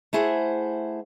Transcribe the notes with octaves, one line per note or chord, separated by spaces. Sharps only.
A3 E4 G#4 C5 F#5